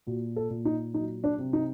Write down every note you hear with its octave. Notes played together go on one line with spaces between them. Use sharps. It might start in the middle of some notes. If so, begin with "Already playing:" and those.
A#2 F#4
A4
A#2
D#4
F#3 D#4
D4
C3
D#4